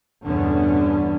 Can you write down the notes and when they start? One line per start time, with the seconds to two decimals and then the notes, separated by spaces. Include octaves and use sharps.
0.23 E2 G2 B2 D3 B3 C#4